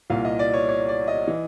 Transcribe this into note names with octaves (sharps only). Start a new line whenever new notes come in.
C2 A#2 F5
D#5
D5
C#5
C#5
D5
D#5
E3